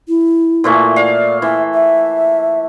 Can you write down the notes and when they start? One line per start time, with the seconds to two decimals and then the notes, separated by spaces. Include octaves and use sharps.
0.09 E4
0.64 A#2 E3 A3
0.96 D5 F5
1.42 E3 E5
1.74 E5